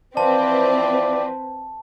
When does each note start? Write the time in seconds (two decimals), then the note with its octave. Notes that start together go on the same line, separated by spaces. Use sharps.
0.17 E3 F3 C4 B4 D5 A5